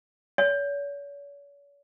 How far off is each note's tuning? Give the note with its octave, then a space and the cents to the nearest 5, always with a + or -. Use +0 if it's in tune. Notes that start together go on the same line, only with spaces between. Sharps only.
C#5 +45